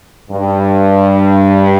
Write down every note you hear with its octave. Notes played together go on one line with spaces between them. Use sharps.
G2